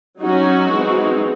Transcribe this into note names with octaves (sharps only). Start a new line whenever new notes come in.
F#3 C#4 D#4 F#4
E3 G#3 C4 D#4